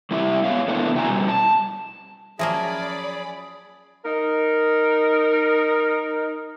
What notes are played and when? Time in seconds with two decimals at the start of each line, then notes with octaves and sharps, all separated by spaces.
0.11 G3 C4 E4 G4 B4 E5
0.44 G#3 B3 F4 C#5 F5
0.68 A3 B3 D4 E4
0.95 C#3 E4 F#4 G#5 A#5
1.09 B2 G3
1.28 A5
2.39 F3 F#3 A#3 C#4 G#4 D5 E5 B5
4.05 D#4 A#4